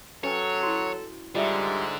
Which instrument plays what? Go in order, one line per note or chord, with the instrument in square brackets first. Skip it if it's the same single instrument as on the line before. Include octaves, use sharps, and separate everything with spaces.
[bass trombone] F#3 [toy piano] C#4 B4 G#5 [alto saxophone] A4 [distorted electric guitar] C#5
[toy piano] E4 F#4
[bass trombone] G#2 [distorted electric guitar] D3 [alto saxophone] G3 [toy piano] F4 D#5 E5